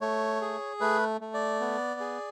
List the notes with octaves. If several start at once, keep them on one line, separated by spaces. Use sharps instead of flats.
A3 C#5
G#4
A3 B4
A3
D5
B3
G#4